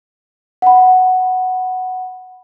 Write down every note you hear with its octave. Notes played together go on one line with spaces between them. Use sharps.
F#5 B5